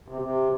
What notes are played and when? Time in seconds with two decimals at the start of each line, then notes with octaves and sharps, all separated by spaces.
0.08 C3
0.22 C3